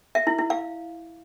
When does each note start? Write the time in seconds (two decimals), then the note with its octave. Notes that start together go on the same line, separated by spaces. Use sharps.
0.15 E5
0.27 E4
0.38 E4
0.50 F5